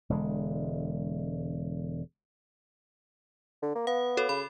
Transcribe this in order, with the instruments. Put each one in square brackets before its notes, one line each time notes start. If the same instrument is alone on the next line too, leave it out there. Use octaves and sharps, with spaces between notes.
[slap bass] E1 D3 G#3
[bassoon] D3
A#3
[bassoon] B3 [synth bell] F5
[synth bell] F#4 A4 C#5
[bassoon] C#3 [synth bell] B5